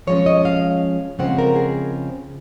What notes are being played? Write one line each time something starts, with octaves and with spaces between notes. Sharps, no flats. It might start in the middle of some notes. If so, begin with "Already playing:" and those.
F3 G#3 C#4 C#5
D#5
F5
C#3 F3 G#3 C4 F#5
A#4
G#4